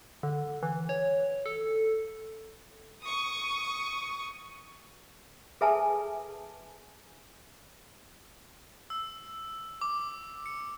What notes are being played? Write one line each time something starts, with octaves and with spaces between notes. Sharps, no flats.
D3
E3
C#5
A4
C#6 D#6
G#4 A4 B4 E5 G#5 A5
E6
D6
C#7